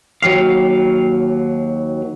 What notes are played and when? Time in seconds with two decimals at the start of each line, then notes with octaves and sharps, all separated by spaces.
0.23 D#2 F#3 G4 F5